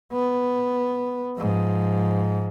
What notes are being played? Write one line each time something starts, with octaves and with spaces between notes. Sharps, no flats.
B3
G#2 F3